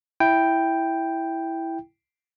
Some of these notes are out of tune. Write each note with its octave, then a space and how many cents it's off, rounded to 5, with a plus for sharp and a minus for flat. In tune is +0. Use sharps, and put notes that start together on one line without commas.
E4 +0 G5 +0